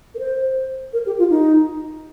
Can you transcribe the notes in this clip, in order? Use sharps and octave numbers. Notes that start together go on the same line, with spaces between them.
A#4
C5
A#4
G4
F4
D#4